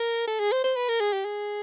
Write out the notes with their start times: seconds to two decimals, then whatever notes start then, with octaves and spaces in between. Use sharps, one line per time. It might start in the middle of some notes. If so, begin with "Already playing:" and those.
Already playing: A#4
0.27 A4
0.40 G#4
0.52 C5
0.64 C5
0.76 B4
0.89 A#4
1.00 G#4
1.13 G4
1.25 G#4